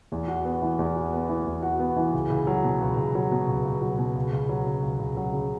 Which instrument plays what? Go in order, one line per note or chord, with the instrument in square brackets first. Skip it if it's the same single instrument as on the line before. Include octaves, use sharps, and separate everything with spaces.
[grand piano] E2
F#4
B3
E3
E2
F#4
B3
E3
E2
F#4
B3
E3
C#2
C#2
F#3
B2
C#2
C#2
F#3
B2
C#2
C#2
F#3
B2
C#2
C#2
F#3
C#3
C#2
C#2
F#3
C#3